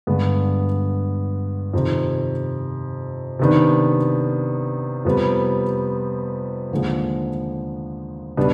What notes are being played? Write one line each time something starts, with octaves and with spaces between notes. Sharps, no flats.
G2 D3 G#3 B3
F2 C3 D#3
C3 D#3 B3 D4
F2 C3 G3 B3
D#2 D3 F3 G#3
B2 G3 B3 D4